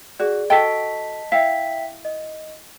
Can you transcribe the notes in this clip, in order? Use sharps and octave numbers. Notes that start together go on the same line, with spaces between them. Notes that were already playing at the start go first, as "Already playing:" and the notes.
F#4 G#4 D5
F#4 A4 D#5 G5 A5 B6
E4 E5 F5 G5 B6
D#5